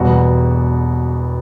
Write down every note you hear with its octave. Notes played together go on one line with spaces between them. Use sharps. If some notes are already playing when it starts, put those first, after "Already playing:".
Already playing: E1 E2 B2 G3 F#4